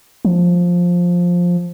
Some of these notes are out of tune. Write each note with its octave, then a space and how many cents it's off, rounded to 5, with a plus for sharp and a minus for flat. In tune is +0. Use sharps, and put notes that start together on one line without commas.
F3 +10